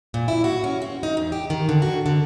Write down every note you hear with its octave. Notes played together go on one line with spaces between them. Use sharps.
A#2
E4
F#4
C#4
C4
D#4
E2
G4
D#3
D3
F#4
D3